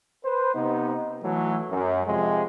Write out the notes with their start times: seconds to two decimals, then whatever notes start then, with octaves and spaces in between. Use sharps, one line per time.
0.24 B4 C5
0.54 C3 B3 D#4
1.23 E3 F#3 A3
1.69 F#2
2.06 F2 C3 F3 G#3